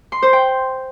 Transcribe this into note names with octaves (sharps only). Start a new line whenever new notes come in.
C6
C5
G5